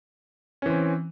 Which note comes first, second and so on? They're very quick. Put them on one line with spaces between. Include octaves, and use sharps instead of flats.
C#4 E3 C4